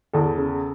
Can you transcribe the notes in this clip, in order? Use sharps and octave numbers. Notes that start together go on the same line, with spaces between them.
E2 A4
C#3